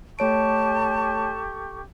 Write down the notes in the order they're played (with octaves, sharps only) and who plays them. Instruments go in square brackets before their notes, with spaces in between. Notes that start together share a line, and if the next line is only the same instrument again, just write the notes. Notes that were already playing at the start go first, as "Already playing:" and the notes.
[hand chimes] A3 C#5 D7 [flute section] G4 A4 C#6 [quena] A5